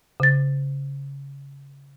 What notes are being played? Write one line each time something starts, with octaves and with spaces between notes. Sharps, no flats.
C#3 A6